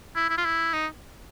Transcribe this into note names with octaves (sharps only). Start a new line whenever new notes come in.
E4
E4
F4
E4
D#4